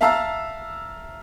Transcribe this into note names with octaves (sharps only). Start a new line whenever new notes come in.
E5 F5 A5 A#5 E6 F6